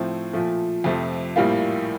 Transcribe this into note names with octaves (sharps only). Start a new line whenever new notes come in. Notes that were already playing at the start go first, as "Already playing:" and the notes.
Already playing: A2 F3 A3 C4
A#2 F3 A3
F2 C3 F3 A3
A#1 A2 G3 A#3 F4